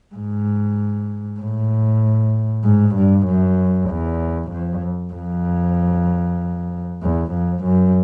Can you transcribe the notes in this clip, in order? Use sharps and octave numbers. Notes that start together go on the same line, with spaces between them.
G#2
A2
G#2
G2
F#2
E2
F2
F2
E2
F2
F#2